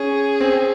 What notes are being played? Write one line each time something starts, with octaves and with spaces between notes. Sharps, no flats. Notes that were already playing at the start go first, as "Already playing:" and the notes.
Already playing: C#4 G#4
C4